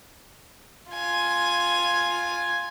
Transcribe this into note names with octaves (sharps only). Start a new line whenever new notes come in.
F4 G#5